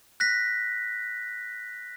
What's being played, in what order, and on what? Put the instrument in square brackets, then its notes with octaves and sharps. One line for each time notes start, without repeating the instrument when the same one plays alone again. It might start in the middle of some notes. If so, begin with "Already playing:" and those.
[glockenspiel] F#6 A#6 B6